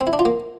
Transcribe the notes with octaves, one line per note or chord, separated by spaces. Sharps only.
C4
E4
D4
F4
A#3